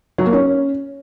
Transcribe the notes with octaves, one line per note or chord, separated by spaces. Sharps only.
F#3
A#3
C#4